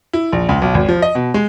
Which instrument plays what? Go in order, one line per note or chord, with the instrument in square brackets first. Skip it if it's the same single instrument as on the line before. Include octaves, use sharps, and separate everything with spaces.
[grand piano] E4
A#1
C#2
B1
G#1
F3
D#5
B2
G#3